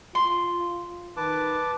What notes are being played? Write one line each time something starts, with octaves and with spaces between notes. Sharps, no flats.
F4 C6
D#3 B4 A5 D6